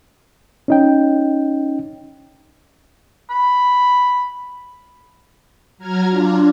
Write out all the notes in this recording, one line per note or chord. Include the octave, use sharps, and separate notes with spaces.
C#4 D#4 G5
B5
F#3 A#5 F6 G#6
D4 F4